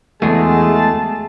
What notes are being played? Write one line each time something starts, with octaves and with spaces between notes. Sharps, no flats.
E2 G#3 A3 F#4 G#4 A5